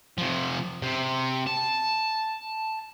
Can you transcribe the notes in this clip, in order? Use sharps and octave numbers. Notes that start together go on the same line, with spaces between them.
C3 F3
C3
A5